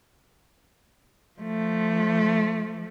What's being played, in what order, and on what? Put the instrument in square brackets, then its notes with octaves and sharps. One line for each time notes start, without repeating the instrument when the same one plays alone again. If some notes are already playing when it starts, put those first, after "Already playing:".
[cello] F3 A3